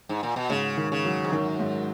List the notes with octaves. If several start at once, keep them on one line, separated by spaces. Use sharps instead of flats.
G#2
A#2
B2
G#2 C#3
D#3
C#3
F#3
G#2
F#2 D#3
G#2